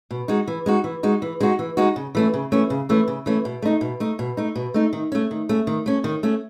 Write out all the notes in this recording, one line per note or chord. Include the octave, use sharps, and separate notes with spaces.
B2
G#3 D#4 F#4
E3
G#3 D#4 F#4
E3
G#3 D#4 F#4
E3
G#3 D#4 F#4
E3
G#3 D#4 F#4
C#3
E3 A3 C#4
C#3
E3 A3 C#4
C#3
E3 A3 C#4
C#3
E3 A3 C#4
B2
A3 D#4
B2
A3 D#4
B2
A3 D#4
B2
A3 D#4
D#3
A3 C#4
D#3
A3 C#4
D#3
A3 C#4
D#3
A3 C#4